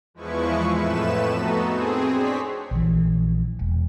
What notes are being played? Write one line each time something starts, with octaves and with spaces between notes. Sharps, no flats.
E2 F3 G#3 E4 B4 C#6
F2 A2 A3 B4 E7
B3 D#4 F#4 A4
C4 G#4
C4 D4 C#5 B6
A#1 E3
E1